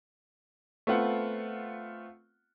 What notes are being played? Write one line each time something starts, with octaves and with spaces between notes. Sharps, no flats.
A3 B3 C4 F4 F#5